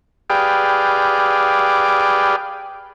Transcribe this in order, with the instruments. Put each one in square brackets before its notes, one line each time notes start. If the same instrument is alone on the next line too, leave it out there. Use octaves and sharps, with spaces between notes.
[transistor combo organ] G4 G#4 B4 D5 F5 G5